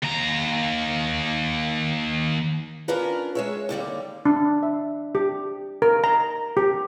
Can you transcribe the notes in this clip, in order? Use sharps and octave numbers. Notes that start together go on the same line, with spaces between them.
D#2 A#5
C#4 D4 F4 A#4 B4 A#5
G#3 C#5 E5
D#2 D3 G3 A#3
D4
E5
G4
A#4
A#5
G4